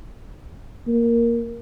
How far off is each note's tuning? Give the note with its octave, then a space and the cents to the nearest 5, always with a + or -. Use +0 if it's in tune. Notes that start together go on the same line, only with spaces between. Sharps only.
A#3 +5